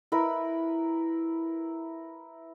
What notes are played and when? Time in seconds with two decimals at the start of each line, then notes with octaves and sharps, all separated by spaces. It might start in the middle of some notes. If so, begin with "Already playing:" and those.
0.12 E4 A#4 B4